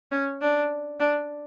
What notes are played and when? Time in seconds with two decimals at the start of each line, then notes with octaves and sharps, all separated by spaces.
0.12 C#4
0.41 D4
1.00 D4